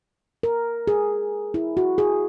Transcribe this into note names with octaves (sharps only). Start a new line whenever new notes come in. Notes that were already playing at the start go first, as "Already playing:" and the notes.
A#4
G#4
E4
F#4
G#4